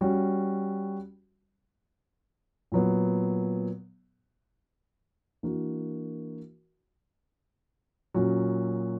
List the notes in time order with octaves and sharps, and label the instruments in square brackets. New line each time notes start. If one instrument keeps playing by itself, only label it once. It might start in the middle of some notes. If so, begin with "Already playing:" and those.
[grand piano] G3 C#4 F#4
A#2 F#3 B3
E3 A#3 D4 F#4 A#4
A#2 F#3 C#4 F#4